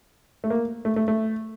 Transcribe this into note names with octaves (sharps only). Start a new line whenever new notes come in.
A3
A#3
A3
A3
A3